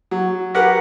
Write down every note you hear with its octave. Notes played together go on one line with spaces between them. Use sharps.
F#3
F#4 G4 A#4 B4 F#5